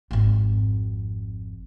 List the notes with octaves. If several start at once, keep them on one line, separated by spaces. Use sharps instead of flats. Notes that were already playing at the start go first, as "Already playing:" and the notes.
G#1 F2